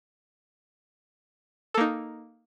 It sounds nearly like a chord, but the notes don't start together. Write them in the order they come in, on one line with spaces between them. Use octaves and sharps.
A4 A#3 D#4